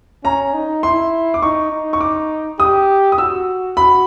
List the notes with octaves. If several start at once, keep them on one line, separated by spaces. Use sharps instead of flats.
C#4 A#5
D#4
E4 C6
D6
D#4 C#6
D#4
C#6
D6
G4 D#6
D#6
F#4 E6
F#4 B5